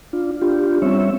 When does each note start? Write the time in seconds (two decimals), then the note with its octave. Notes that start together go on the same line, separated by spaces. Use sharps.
0.13 D4 F4
0.41 D4 F4 G4
0.82 G3 C4 C#4 C#5 E5